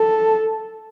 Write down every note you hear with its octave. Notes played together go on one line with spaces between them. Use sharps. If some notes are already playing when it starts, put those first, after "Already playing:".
Already playing: A4